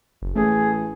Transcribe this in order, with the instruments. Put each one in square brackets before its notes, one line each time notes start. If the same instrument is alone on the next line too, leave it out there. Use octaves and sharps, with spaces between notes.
[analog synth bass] F#1
[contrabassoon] A1 [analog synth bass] A3 [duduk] G#4